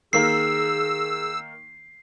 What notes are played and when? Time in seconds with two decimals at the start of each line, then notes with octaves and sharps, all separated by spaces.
0.13 D#3 A#3 G#4 A#4 E6 C7